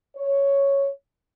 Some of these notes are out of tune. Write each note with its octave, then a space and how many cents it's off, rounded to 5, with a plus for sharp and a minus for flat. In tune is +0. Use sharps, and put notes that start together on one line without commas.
C#5 +0